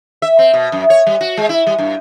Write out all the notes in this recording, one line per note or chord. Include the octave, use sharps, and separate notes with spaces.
E5
C4
B2
F#2
C#5
G3
F#4
G#3
E4
G3
G2